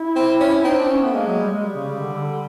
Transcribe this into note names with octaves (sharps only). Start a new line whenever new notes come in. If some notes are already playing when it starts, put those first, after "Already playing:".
Already playing: E4
C4
C#4
C4 D#4
D4
C#4
A3 B3
G#3 A#3
F#3
G3
G#3
G3
C#3
C#3
D3
D3